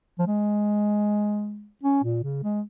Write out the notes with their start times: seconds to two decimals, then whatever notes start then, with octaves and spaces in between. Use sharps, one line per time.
0.19 F3
0.27 G#3
1.84 C#4
2.04 A#2
2.23 C#3
2.44 G#3